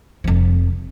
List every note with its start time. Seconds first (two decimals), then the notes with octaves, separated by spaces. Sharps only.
0.24 F1 F3